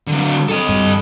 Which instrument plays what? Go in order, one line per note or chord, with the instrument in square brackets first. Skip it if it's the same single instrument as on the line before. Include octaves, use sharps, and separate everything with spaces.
[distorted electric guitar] D3 F#3
A4 D#5
[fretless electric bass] G2